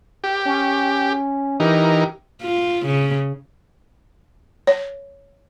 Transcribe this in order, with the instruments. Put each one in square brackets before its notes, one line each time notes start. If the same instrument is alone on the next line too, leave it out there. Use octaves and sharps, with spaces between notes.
[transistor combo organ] G4
[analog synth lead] C#4
[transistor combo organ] E3 D#4 A#4 [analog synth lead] G4
[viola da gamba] F4
C#3
[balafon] C#5